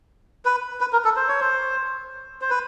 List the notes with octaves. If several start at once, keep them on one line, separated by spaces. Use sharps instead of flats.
B4
B4
A#4
A4
C5
C#5
C5
C5
B4